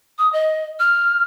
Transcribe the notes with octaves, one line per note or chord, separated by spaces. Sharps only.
D#6
D#5
F6